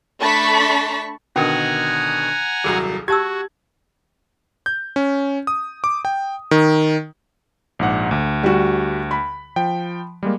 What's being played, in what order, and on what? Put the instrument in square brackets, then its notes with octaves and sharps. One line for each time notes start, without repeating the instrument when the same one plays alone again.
[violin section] A3 D4 A5 B5 C#6 B6
[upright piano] B2 D3 D#3 [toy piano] C#4 A#4 [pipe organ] F#5 G#5 A#5
[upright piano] D#1 C2 F#3 [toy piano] G#4
[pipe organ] F#4 [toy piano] G4 A5 E6 [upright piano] G#6
[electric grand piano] G6
C#4
D#6
D6
G5
D#3
A#1 G#2 F#5
D2
[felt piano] G3 F#4
B5
[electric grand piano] F3 G5
G3 G#3 A#3